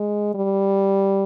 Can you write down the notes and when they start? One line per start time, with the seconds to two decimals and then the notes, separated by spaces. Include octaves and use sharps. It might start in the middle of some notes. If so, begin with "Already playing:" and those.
Already playing: G#3
0.35 G3